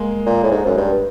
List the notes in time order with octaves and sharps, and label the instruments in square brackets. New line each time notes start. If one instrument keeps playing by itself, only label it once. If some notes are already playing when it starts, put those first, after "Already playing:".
Already playing: [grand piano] G#3 A#3
[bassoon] A#2
A2
G#2
F#2
G2